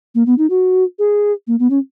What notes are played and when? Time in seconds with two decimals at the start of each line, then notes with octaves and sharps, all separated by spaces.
0.15 A#3
0.26 B3
0.38 D#4
0.50 F#4
0.99 G#4
1.47 A#3
1.59 B3
1.70 C#4